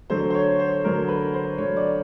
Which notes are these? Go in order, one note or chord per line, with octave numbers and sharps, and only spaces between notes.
D3 F#3 A3 C5
C5
C#5
C5
D3 F#3 A3 A#4
B4
C5
D3 F#3 A3 C#5
D5